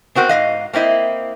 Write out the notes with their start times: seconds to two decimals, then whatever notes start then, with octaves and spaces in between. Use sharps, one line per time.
0.15 B3 C4 F#4 A#4
0.29 G#2 B3 D#5 F5
0.73 A#3 C4 E4 D#5